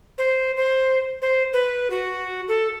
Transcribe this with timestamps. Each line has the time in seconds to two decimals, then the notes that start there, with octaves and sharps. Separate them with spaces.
0.18 C5
0.57 C5
1.22 C5
1.53 B4
1.90 F#4
2.48 A4